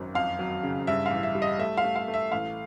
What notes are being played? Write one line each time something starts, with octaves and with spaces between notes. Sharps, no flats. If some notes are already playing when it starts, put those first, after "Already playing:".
Already playing: G#1 F#2
F2 F5
F#3
C#3
G2 E5
F5
A1
E5
G3
D#5
A3 E5
F5
A3
F5
A3
E5
A1 F5